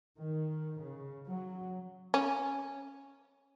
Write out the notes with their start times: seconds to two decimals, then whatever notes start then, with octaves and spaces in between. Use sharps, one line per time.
0.17 D#3
0.80 C#3
1.27 F#3
2.14 C#4